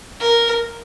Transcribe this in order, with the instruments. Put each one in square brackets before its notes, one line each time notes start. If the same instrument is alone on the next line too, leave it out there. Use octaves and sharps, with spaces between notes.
[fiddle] A#4